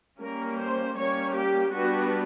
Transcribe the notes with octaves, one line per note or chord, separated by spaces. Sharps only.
G3 A#3 C#4 A#4
C5
G3 A#3 C#4 C#5
G4
G3 B3 D4 F#4